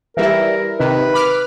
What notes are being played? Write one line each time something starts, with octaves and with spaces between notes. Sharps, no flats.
E3 G3 E4 A#4
C3 D#3 B4
B5 D6 F6